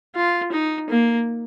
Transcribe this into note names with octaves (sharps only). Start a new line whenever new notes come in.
F4
D#4
A#3